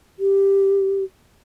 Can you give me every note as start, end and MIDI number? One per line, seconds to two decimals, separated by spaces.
0.19 1.04 67